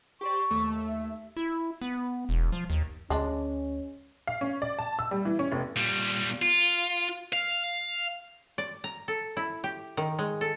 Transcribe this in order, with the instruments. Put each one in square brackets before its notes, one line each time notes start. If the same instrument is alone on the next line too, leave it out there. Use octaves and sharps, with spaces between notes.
[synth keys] G4 C5 D5 [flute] C#6
[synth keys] D#2 A3 E6
[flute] E5
[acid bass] E4
B3
E1
F3
D#2
[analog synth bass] D2 [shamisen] G#3 D4 [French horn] C#4
[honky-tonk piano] F5
C#4
D5
A5
E6
G3
E3
C#4
F1
[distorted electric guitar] A#2 G3
F4
F5
[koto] D5
A#5
A4
E4
G4
D#3
G#3
A4